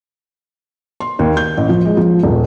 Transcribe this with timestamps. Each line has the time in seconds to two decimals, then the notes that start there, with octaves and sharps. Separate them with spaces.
1.00 C6
1.19 D#2
1.37 G6
1.57 A1
1.69 F3
1.85 G#3
1.97 F3
2.23 D#1